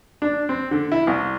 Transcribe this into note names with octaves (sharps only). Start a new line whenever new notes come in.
D4
C4
D3
E4
C2